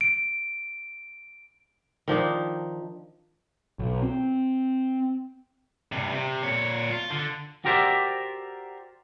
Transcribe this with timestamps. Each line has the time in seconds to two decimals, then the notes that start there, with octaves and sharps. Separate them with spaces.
0.01 D7
2.08 D#3 F3 D4 D#4
3.79 B1
4.02 C4
5.92 G2 C3
6.11 C3
6.43 A#2 C#5
6.90 F4
7.10 D3
7.65 F#4 G4 A#4 C5 D5 E5